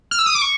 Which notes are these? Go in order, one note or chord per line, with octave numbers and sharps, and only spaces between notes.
F6
E6
D#6
D6
C#6